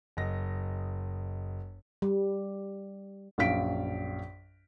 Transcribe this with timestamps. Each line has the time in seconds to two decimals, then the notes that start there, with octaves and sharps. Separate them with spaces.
0.17 F#1 D#5 A#6
2.02 G3
3.38 A#1 F#2 F5 B6 D7